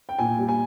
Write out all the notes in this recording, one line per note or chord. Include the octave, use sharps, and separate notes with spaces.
G5
A#2 G#5
G3
G#5